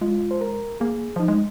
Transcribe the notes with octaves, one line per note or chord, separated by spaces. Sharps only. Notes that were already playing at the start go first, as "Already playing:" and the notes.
G#3 F4
C5
A#4
A#3 G#4
F3 D#4
G#3